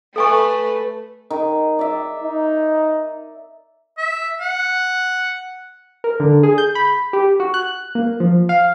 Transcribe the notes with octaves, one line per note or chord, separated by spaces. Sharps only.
A3 A4 B4 G#5 C#6
D#3
D5 E5
D#4
E5
F#5
A#4
D3
G#4
G6
B5
G4
F#4
F#6
A#3
F3
F5